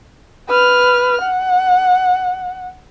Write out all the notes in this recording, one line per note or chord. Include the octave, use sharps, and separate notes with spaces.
B4 F6
F#5